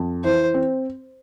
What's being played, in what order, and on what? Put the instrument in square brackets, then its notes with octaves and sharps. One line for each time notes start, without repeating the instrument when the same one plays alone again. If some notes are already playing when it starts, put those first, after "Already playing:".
Already playing: [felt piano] F2
[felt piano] E3 [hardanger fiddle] C5
[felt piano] C4